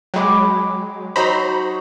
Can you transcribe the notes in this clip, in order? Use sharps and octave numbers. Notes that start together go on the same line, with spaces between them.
F#3 G#3 G5 B5 D6
F#3 D#4 C5 C#5 A#5 B5